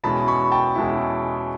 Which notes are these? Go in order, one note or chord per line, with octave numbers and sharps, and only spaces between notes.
E2 B2 G#3 C#4 E4 A5 B5
B5 C#6
G5 A5
E2 B2 G#3 C#4 E4